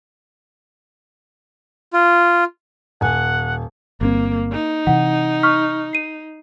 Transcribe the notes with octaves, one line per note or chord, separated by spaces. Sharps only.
F4
D#1 F#5 G#5
G1 G2 A#3 C4
D#4
C3 E3 F#5
C#6 F6 B6
C7 D#7